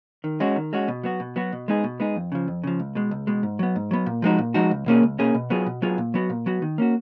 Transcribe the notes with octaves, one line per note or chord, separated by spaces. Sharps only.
D#3
G#3 C#4 F#4
D#3
G#3 C#4 F#4
B2
F#3 B3 F#4
B2
F#3 B3 F#4
B2
G#3 B3 D#4 G#4
B2
G#3 B3 D#4 G#4
F2
C#3 F3
F2
C#3 F3
C#2
B2 G#3
C#2
B2 G#3
G#2
F#3 B3
G#2
F#3 B3
A#2
F3 G#3 D#4 F#4
A#2
F3 G#3 D#4 F#4
C#2
B2 A#3 C#4 G#4
C#2
B2 A#3 C#4 G#4
B2
F#3 B3 F4 G#4
B2
F#3 B3 F4 G#4
A#2
F#3 B3 F#4
A#2
F#3 B3 F#4
D#3
A#3 C#4 F#4